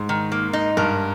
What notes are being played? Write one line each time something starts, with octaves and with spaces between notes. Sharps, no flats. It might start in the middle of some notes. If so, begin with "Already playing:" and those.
Already playing: G#2
D#3
A#3
D#4
G2 A#4